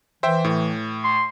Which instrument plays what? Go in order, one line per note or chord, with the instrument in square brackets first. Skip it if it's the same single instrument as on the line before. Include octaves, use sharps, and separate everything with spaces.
[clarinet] E3 [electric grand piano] C5 E5 G5
[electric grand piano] A2
[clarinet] C6